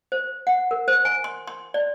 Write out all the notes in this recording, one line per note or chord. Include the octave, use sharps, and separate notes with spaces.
C5
F#5
A#4
C5
G#5
C6
C6
D5